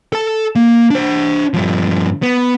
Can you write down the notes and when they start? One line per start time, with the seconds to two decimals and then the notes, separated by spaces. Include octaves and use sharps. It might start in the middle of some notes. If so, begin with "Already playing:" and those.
0.13 A4 A5
0.56 A#3
0.91 D4 C5
1.54 G2 F3
2.23 B3